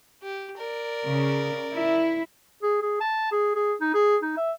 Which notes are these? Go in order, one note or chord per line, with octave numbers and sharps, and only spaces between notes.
G4
A#4 D5
C#3
E4
G#4
G#4
A5
G#4
G#4
D#4
G#4
D#4
E5